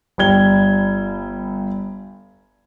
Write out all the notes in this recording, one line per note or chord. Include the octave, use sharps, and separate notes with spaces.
G1 G3 G#6 G7